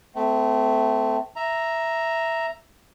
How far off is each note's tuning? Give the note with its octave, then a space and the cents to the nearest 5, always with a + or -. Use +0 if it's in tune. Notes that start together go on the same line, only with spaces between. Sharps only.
A3 +0 C4 -30
E5 +0 A#5 +0